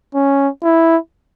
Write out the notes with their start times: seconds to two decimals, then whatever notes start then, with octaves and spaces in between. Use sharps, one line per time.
0.15 C#4
0.63 E4